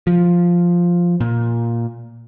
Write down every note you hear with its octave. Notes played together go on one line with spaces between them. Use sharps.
F3
A#2